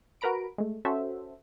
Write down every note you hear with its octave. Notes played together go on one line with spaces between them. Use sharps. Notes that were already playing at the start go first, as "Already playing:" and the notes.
F#4 A#4 B4 A#5 B5 D7
G#3 A3
C#4 F#4 A4 C5 E5